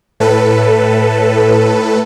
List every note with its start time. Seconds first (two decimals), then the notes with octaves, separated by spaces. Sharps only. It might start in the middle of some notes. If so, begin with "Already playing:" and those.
0.20 A2 A4 B4